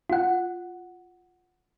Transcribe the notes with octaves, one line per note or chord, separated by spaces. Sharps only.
F4 F#5